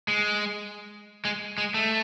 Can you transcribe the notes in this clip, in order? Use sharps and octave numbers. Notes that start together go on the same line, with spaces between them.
G#3
G#3
G#3
A3